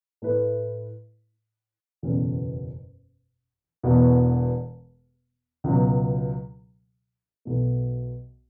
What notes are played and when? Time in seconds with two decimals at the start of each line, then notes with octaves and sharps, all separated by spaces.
0.22 A2 A3 E4 B4
2.03 F#1 E2 B2 A3 C#4
3.83 E1 E2 B2 B3
5.64 C#2 B2 F#3
7.45 B1 B2 A3